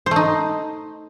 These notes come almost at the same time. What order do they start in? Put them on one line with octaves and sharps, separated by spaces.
C5 A3 D#4